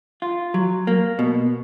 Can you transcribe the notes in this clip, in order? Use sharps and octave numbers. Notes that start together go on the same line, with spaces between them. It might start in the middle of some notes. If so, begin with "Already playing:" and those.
F4
F#3
A#3
B2